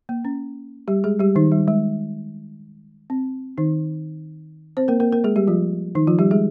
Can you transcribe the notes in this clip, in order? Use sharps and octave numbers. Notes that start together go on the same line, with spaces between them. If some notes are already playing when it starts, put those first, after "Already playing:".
A#3
C#4
G3 G4
G#3 G#4
G3 G4
D#3 D#4
G3
G#3
C4
D#3 D#4
C4 C5
A#3 A#4
A#3 A#4
A#3 A#4
G#3 G#4
G3 G4
F3 F4
D#3 D#4
F3 F4
G3 G4
G#3 G#4